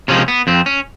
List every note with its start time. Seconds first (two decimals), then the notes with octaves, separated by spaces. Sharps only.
0.08 C3 F3 G#3 C#4
0.28 B3
0.47 F2 C4
0.66 C#4